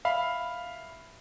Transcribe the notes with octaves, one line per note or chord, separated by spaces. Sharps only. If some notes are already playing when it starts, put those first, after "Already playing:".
E5 F5 B5